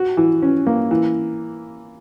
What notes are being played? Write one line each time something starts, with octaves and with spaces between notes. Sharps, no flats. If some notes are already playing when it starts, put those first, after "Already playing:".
Already playing: F#4
E3
C#4
A#3
E3